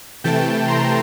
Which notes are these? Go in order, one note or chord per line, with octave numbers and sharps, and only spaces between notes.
C3 E3 A3 G5 A5
A#5 C6